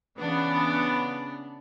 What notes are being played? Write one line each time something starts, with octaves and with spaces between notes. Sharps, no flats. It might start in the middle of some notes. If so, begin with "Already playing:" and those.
C#3 E3 B3 D4